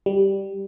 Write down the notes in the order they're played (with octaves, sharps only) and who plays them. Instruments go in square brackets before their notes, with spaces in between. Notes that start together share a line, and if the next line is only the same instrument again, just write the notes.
[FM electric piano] G3